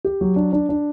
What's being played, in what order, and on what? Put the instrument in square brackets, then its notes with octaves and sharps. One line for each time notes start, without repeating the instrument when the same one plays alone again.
[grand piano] G4
F#3
D4
D4
D4